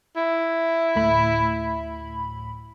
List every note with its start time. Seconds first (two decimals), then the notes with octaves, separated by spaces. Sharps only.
0.16 E4
0.95 D2 A2 B5